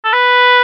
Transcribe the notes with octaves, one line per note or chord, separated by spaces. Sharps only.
A4
B4